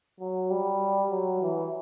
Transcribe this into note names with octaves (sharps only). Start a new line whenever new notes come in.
F#3
G3
F#3
E3